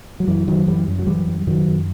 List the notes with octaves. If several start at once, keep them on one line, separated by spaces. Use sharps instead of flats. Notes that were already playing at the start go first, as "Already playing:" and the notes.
F#3
F#2 E3
F#2 D#3 F#3
F#2 E3 G3
F#2
F#3
F#2 E3 G3
F#2
F#2 D#3 F#3
F#2